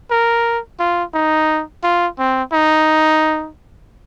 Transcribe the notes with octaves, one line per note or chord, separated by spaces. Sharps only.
A#4
F4
D#4
F4
C4
D#4